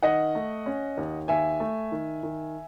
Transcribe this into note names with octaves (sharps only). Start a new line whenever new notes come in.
D#3 D#5 F#5
A3
C#4
D#2
D#2 E5 G#5
A3
D#3
D#3